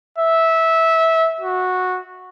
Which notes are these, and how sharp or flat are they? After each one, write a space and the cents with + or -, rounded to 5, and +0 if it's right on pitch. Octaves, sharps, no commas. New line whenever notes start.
E5 -15
F#4 -10